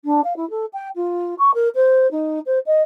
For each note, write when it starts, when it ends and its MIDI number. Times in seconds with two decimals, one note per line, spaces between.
0.05 0.21 62
0.24 0.36 77
0.36 0.48 64
0.50 0.65 69
0.73 0.89 79
0.95 1.34 65
1.38 1.51 85
1.54 1.68 70
1.75 2.10 72
2.11 2.39 63
2.46 2.59 72
2.66 2.82 75